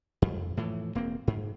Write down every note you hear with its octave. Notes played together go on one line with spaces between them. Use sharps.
F2
A2 E3 F3
E1 A#3 C4
G#2